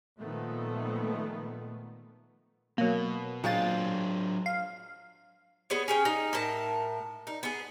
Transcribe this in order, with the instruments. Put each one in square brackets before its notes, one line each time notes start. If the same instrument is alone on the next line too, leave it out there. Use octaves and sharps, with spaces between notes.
[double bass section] A#2 D#3 F3 G#3 A3 B3
[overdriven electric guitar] B2 [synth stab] F#3 A#3
[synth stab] A#2 A6 [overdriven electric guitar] F#3 D4 [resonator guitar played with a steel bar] G#3 C4 F4
[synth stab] F5
[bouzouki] B3 G#4 B4 C#5
C#4 G#4 G5
D#4
A2 A#4 A5
D#4
B3 G#4